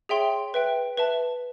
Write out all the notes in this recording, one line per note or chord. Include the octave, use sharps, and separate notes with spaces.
G#4 C#5 E5 G5 C6
B4 E5 G5
B4 E5 A5